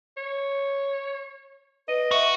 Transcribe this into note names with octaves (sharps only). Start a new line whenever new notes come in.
C#5
B4 D#5
F#4 E5